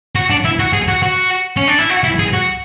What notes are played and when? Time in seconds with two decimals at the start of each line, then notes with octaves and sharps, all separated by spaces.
0.15 F#4
0.30 D4
0.45 E4
0.59 F#4
0.73 G#4
0.88 F#4
1.03 F#4
1.57 C#4
1.68 D4
1.79 E4
1.90 F#4
2.04 E4
2.19 G#4
2.33 F#4